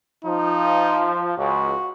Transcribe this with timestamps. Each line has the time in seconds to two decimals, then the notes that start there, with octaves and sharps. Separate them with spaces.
0.25 F3 D#4
1.38 C#2 F#4